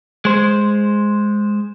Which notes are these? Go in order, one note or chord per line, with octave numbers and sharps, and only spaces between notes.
G#3 C5